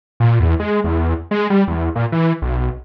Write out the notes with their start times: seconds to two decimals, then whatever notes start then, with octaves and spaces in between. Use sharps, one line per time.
0.20 A#2
0.40 E2
0.60 G#3
0.84 E2
1.31 G#3
1.50 G3
1.68 E2
1.95 A#2
2.12 E3
2.42 B1